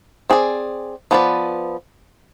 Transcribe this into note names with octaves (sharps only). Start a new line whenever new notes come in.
C4 G#4 D5
F3 B3 E4 B4 D5